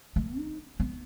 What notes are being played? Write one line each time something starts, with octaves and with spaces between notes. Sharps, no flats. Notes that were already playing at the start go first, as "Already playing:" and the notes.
A3
D#4
B3